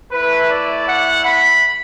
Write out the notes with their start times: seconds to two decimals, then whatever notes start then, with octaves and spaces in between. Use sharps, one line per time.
0.12 A3 E4 B4
0.50 D5
0.87 F#5
1.25 B5